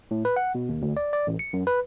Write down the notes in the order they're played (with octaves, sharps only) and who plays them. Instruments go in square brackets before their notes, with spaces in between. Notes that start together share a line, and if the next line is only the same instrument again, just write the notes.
[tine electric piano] A2
B4
F#5
B2
D#2
D2
D5
D5
A1
C#7
F#2
B4